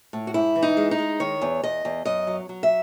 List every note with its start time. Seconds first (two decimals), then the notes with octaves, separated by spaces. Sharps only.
0.13 A2
0.27 F#4
0.34 G#2 E4
0.56 E3
0.62 D#4
0.77 G#3
0.91 D#4
0.98 G#3
1.20 D#3 C#5
1.41 E2
1.63 E2 D#5
1.85 E2
2.05 F#2 D#5
2.27 F#3
2.49 F#3
2.63 E5